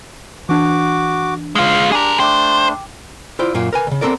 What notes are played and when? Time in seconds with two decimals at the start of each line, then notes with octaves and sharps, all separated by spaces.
0.49 E3 D4 F#4 D6
1.55 G#3 F4 F5
1.92 D4 G4 G#4 A#4
2.20 A3 D4 C5 G5 D6
3.39 E4 F4 C5 D5
3.54 F#2 A#2 A#3 F4
3.73 A#4 B4 G#5
3.87 D2 C#3
4.01 B3 C4 A4 A#4 D5